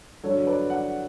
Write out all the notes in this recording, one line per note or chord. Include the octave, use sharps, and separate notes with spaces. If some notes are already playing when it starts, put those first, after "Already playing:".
G2 D3 F#3 A4 C#5
B4 D5
D5 F#5